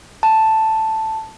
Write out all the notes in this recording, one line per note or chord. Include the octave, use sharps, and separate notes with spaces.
A5